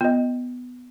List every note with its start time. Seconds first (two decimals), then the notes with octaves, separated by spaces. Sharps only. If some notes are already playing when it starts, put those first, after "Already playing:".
0.01 B3 F4 D#5